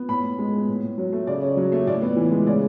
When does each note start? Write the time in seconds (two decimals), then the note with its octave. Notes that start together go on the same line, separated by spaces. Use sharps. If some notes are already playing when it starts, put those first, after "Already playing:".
Already playing: B3
0.09 A2 B5
0.23 A2
0.39 G#3
0.53 B3
0.68 A2
0.83 A2
0.98 F#3
1.12 A3
1.27 C#3 D5
1.42 C#4
1.57 F#3
1.72 A3
1.87 A2 D5
2.02 B3
2.17 E3
2.32 G#3
2.47 C#3 D5